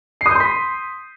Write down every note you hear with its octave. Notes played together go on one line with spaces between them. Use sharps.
C6 D#6 G6 B6 C7